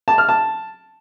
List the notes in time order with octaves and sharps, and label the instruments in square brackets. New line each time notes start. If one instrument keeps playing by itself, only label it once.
[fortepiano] A5
F6
A5